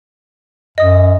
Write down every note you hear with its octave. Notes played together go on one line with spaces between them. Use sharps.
F#2 D#5 D#6